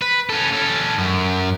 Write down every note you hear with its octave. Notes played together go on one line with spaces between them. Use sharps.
B4
C#4 A4
C#4 A4
F#2